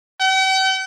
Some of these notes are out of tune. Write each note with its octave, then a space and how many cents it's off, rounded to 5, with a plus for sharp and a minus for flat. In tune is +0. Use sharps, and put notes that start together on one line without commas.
G5 -45